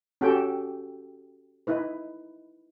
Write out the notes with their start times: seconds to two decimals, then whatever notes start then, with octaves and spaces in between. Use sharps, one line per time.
0.21 C#4 F#4 G4 A4 G5
1.67 D#4 E4 B4